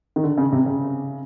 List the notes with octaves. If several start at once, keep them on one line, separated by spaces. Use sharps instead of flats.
D#3
D3
C#3
C3
C#3